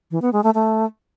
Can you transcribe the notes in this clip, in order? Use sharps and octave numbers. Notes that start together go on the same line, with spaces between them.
E3
B3
G#3
A3
A3